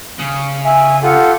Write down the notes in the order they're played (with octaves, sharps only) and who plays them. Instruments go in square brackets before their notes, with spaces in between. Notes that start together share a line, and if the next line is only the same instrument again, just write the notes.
[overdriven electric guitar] C#3
[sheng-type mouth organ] E5 [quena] G#5
[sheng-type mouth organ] F4 G4 A4 [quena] F#5